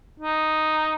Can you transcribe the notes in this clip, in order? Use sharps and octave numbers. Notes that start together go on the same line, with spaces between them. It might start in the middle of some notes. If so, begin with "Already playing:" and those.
D#4